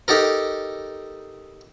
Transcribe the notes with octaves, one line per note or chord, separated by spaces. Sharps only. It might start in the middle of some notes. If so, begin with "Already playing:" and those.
D#4 G4 A4 A#4